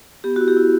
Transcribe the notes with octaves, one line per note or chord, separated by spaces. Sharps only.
B3 G4
F#4
E4
G4
E4